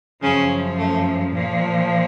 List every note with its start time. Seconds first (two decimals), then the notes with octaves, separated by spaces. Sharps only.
0.22 F#2 C#3 F3 C#4
0.77 A3
1.32 A#2 F3